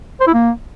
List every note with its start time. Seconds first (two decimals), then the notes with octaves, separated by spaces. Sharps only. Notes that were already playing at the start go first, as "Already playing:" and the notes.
0.21 C5
0.27 E4
0.34 A#3